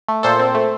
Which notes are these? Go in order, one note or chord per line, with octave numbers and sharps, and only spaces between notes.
A3
A#2 A4 C5
C4
A3